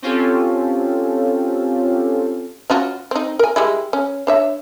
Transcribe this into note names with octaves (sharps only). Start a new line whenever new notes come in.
C4 C#4 F4 G4 A4
C#4 F4 F#4
C4 D#4
A#4 G#5
G3 G#3 E4
C#4
D4 C#5 E5